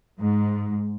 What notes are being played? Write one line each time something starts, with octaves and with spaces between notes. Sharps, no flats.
G#2